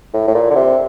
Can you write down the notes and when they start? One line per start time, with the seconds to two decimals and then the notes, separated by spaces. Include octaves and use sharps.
0.14 A2
0.27 A2
0.35 A#2
0.50 D3
0.55 C3